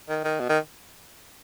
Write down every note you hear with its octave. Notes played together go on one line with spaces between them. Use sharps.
D#3
D#3
B2
D#3